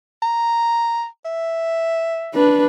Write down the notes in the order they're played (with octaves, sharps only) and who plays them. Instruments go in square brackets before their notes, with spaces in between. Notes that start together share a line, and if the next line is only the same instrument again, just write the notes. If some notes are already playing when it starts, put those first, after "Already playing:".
[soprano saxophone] A#5
E5
[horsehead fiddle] D4 B4